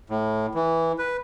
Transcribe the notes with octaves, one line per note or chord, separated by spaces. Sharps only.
A2
E3
B4